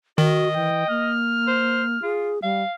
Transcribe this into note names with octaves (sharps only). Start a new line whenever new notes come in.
D#3 F#4 D#5
E3 G5
A#3 F6
C5
F4 G#4
G3 F5